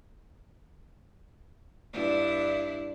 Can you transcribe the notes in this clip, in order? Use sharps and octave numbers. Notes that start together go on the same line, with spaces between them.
G2 D4 E4